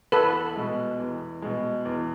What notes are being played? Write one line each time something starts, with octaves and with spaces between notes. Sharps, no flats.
E2 A4 B4
B2 G#3
E2
B2 G#3
E2